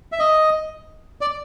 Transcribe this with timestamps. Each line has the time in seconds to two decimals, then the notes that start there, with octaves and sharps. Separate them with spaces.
0.12 E5
0.19 D#5
1.21 D5